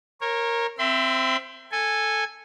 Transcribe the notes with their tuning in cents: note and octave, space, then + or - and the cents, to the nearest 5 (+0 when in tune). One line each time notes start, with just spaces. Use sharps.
A#4 +0 C#5 -25
C4 +0 E5 +20 C6 -40
A4 +0 G#5 -5